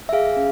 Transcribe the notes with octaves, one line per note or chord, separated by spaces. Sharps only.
E5
G#4 F5
C#4